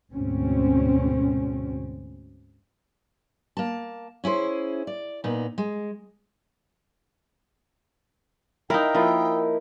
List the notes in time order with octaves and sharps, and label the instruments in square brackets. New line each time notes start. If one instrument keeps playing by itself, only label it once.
[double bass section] D2 G#2 B2 C4 C#4
[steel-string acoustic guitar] A#3 A5
C#4 E4 G#4 C5
D5
A#2 B3 D#4
G#3
[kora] D#4 E4 [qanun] A#4 [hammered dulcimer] C#5 F5 [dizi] G5
[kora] F3 [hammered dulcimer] A#3 E4 D#5